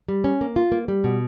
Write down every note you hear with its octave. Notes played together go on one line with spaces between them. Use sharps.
G3
C#4
A#3
F4
A#3
G3
B2